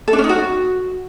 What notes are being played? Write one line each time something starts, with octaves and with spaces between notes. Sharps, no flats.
A4
D4
C#4
D#4
F#4